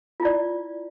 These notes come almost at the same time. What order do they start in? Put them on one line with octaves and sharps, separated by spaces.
F4 E4 D5